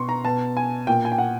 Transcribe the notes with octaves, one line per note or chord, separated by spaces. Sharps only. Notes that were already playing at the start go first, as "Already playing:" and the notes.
Already playing: B2 C6 C#6
A#5
B2 A5
G#5
A#2 G5
G#5
G5
F#5